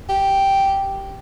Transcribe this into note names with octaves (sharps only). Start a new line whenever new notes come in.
G4